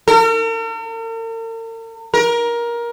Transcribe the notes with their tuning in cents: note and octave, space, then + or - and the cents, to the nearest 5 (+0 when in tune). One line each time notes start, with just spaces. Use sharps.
A#4 -45
A#4 +20